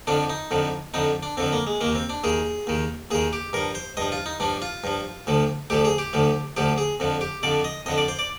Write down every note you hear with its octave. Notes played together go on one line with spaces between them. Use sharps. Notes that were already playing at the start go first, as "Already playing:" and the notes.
F2 D3 F3 D4
D#4
F2 D3 F3
F2 D3 F3 D#4
D4
F2 D3 F3 C4
A#3
G#3
D#2 D#3 A#3
C4
D4
D#2 D#3 G#4
D#2 D#3
D#2 D#3 G#4
G4
G2 F3 A#4
C5
G2 F3 D#5
F4
D#4
G2 F3 D4
F4
G2 F3
D2 D3 F3
D2 D3 F3 G4
G#4
G4
D2 D3 F3
D2 D3 F3 G4
G#4
F2 D3 F3
G4
F2 D3 F3 D5
D#5
F2 D3 F3 D#5
D5
C5
D5